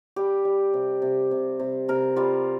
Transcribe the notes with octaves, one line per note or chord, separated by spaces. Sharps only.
G3 G4
G3
C3
C3
C3
C3
C3 A#4
G3 F4